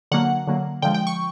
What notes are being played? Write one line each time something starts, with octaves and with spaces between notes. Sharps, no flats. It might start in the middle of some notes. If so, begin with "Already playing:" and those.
D3 F#3 A#3 F#5
D3 F#3 A#3
D3 F3 G#3 G5
G5
C#6